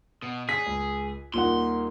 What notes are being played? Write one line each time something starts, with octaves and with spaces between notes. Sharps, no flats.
B2
G#4 B6
C#2
D#1 A#2 A#3 D#4 F#5 C6